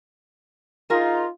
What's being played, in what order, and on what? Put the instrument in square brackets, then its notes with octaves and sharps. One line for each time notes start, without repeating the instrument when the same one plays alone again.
[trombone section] D#4 F4 [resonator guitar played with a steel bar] G#4 A#4